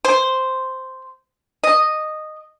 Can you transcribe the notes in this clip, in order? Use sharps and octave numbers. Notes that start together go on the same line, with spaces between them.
C5
D#5